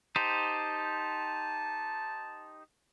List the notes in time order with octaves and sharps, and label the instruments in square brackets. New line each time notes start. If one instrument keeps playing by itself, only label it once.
[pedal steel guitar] D#4 G4 C5 [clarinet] A5